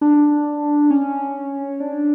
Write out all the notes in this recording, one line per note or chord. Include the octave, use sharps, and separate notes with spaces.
D4
C#4
D4